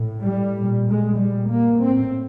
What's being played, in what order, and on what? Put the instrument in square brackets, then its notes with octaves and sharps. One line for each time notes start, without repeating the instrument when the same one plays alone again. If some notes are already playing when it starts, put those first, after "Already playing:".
Already playing: [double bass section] A2
G3
A#2
G#3
A#2 G3
A#3
A2 C4